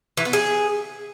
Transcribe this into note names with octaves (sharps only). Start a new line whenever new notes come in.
E3
B3
G#4